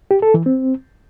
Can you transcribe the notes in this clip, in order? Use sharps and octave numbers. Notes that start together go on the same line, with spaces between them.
G4
A4
E3
C4